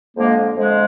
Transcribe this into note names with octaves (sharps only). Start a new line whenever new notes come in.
F2 D3 F3 G#3 A#3
F2 D3 F3 G#3